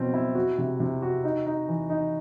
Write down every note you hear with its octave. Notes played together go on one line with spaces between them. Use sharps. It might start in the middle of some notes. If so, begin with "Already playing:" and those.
Already playing: B2 F#3 C4
E4
F#4
C3
C3
F#4
D#4
D#4
E3
D#4